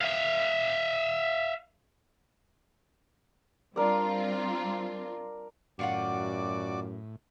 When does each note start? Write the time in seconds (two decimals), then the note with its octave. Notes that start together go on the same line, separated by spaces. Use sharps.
0.01 E5 F5
3.76 G3 C4 D4 F4 A#4 D5
5.79 F#2 A2 D#3 F4 F#4 D5 F#5 D6